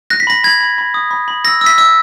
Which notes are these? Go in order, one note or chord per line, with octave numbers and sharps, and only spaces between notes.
F#6 A#6
B6
B5 A#6
B5 G#6
B5
B5
D#6
B5
B5
E6 A#6
E6
B6
E6